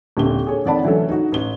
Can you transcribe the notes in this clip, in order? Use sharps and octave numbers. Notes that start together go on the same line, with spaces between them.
D#1 A#2 D3 C4 G7
G#4 A4 C#5
F2 D#3 D5 F#5 A5 B5
D3 E3 F#3 A3 C#4 A4
D#4 F#4
A1 G7